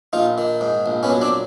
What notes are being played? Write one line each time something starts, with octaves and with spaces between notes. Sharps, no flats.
A#1 D#4 F4
D#3
G#2
A#1
B3 C#4
F#3
C4 D4